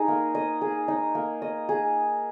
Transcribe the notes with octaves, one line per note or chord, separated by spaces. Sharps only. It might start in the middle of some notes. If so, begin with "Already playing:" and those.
Already playing: D#4 G#4
A#3
D#5
G#4
D#4
A#3
D#5
G#4